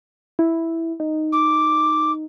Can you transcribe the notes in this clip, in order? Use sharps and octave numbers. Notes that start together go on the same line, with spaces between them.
E4
D#4
D6